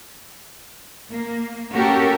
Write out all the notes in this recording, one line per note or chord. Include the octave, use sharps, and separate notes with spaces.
A#3
A#3 C#4 F#4 G4 A4 A#4